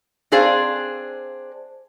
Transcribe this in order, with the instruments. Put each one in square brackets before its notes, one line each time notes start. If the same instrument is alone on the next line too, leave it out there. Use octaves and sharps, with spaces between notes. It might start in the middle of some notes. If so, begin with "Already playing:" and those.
[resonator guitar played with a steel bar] C4 D4 G#4 C5 D5 F5